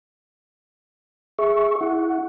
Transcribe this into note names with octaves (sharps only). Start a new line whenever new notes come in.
G#4 E5 C#6
E4 F#5